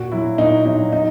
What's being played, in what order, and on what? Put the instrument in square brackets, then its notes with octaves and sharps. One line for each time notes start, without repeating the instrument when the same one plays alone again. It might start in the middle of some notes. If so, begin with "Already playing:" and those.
Already playing: [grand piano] A#2 F#4
F#3 E4
A#2 D#4
F#3 D#4
D#4